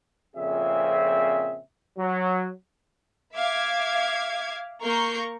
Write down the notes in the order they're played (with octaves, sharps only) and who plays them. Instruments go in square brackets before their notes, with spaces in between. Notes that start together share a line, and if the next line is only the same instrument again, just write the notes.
[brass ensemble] F2 A#2 C#3 C4 G#4 E5
F#3
[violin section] E5 F5 D6 G#6
A#3 A#4 A#5 C#6 G6 C7